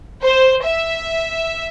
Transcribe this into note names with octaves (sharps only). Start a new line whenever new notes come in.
C5
E5